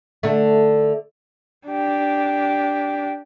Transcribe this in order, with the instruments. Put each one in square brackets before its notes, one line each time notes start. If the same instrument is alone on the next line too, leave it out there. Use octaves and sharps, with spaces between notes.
[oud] D3 A3
[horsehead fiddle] D4 G4